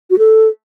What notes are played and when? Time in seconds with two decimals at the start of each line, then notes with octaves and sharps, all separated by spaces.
0.10 F#4
0.18 A4